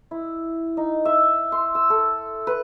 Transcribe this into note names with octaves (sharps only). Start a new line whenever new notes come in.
E4
D#4
E5
C6
E6
A4
B4